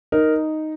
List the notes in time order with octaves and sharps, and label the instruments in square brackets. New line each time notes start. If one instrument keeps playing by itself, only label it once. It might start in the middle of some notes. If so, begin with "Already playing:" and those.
[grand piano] D#4 A#4